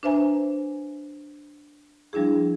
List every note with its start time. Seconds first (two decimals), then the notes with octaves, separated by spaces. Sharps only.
0.03 D4 B4 C5 E5 G#5 A#5
2.13 F3 G3 D4 E4 G#4